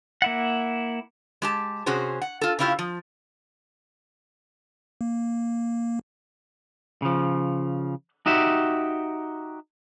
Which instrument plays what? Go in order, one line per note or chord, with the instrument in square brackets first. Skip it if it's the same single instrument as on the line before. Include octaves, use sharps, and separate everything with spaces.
[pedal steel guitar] A#3 E4 F#5
[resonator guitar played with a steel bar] G#3 G4 A5
C3 C#4 F#4 G#4 C5
F#5
F4 A4
C#3 C#4 E4 F4 G4
F3
[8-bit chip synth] A#3
[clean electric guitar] C#3 F3
D#4 F#4 G4 E5